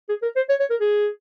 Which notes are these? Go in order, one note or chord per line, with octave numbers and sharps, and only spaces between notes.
G#4
A#4
C5
C#5
C#5
A#4
G#4